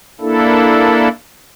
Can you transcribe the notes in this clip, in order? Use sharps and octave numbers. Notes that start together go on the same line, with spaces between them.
A#3 D4 E4 A4